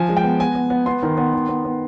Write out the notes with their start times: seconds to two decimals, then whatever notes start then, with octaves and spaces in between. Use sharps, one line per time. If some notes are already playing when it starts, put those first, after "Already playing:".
Already playing: F3 G#5
0.09 G#3
0.17 G5
0.24 B3
0.40 B3 G#5
0.55 B3
0.70 B3
0.86 B3 C6
1.03 D#3
1.17 B3
1.33 D#3
1.48 B3
1.65 B3